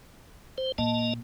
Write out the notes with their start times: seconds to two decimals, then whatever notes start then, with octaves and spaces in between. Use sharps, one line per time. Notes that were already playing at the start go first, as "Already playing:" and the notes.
0.58 C5
0.78 A#2 A#3 D#5 A5